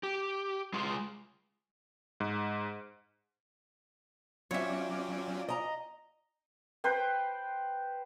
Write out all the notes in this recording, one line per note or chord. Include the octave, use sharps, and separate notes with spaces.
G4
G#3 F4 G#4
G#2
F#3 C4 C#4 F4 C#5 D5 E5
D#5 A#5
B4 C5 G5